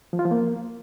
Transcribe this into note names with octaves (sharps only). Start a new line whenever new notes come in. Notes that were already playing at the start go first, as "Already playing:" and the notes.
F3
F4
F3
A#3